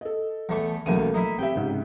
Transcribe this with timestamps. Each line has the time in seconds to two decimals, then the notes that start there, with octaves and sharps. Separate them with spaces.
0.01 A4 D#5
0.49 E2 A3 C#6
0.86 B1 E2 C#3 A3 A#3 D#7
1.14 D#4 E4 E5
1.38 C4 G4 E5 G5
1.55 C#2 G#2 C3